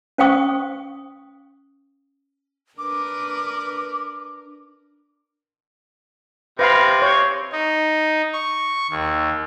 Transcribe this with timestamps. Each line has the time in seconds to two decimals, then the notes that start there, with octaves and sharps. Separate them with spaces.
0.18 C#4 C5 F5 G5 C#6 D#6
2.78 D4 A#4 B4 D6
6.59 C3 B4 F5 B5 A#6
7.02 C#5 C6 C#6
7.53 D#4
8.33 C#6
8.90 D#2